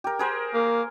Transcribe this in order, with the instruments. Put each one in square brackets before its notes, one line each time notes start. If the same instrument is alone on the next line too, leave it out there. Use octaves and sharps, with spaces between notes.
[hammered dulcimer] G4 A#4
G#4 A#4 C5
[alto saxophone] A#3